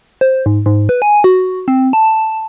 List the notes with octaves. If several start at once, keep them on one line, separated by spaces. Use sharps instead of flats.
C5
G#2
G#2
B4
G#5
F#4
C4
A5